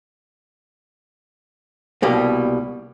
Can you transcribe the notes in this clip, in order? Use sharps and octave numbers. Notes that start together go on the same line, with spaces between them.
C2 B2 G3 A#3